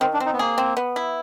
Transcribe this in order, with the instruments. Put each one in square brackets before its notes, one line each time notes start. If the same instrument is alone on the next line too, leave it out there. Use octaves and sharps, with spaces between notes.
[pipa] D#3 [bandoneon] C4
[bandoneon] D4
[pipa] C4
[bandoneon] D#4
B3
[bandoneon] A#3 [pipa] G#4
[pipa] C4
B3
E4